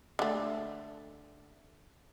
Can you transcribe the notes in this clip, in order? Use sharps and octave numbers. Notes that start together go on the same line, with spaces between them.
D3 A3